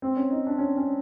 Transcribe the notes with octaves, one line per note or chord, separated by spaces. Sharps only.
C4
C#4
D#4
D4
C#4
C#4